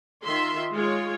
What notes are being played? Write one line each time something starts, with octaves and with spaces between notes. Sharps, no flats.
D#3 F4 E5 C6
G#3 F4 C#5